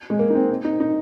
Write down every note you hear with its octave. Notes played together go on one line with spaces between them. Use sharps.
G#3
A#3
D#4
C4
C4
D#4
D#4